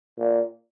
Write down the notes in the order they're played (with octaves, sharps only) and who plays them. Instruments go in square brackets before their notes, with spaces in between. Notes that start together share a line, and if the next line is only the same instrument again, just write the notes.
[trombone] A#2